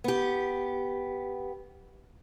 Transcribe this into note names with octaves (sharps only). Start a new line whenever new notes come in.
B3 G4